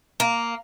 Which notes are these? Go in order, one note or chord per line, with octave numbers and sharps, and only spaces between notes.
A#3